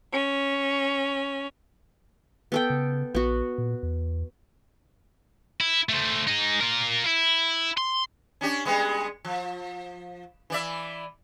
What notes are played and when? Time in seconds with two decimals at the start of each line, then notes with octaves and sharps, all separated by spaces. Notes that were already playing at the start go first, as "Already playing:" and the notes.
0.13 C#4
2.52 B3 A4 G5
2.70 C#3
3.15 A#1 B3 F#4
3.58 A#2
3.83 E2
5.61 E4
5.89 A3 C5
6.27 D#4 G#4
6.61 F4 A#4
7.06 E4
7.77 C6
8.41 C#4 D4 G4
8.65 G3 G#3 B3
9.25 F3
10.50 E3 D5 E5